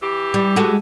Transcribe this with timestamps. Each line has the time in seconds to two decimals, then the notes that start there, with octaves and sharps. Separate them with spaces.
0.01 E3 G4
0.34 G3
0.56 G#3 F#4 A4